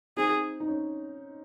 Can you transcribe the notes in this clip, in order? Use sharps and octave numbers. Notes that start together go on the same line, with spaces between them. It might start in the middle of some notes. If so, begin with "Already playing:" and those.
C4 D#4 G#4
D#4
C#4